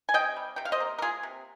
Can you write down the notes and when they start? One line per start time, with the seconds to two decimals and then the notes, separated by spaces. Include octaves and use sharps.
0.09 G#5
0.14 C3 D#5 G5
0.37 G3
0.56 C3 G5
0.65 F5
0.72 C5 D#5
0.80 A#3
0.98 A#4
1.02 A#3 F4 G#4
1.23 C3